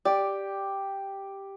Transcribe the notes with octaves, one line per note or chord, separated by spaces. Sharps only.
G4 D5